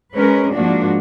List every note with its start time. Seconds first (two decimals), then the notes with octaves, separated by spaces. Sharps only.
0.15 G#3 C#4 A#4 B4
0.53 G#2 F3 A#3 D4 F#4